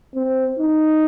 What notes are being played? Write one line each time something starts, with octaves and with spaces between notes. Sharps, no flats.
C4
D#4